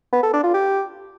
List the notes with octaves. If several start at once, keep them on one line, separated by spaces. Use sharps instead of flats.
B3
A4
D4
F4
G4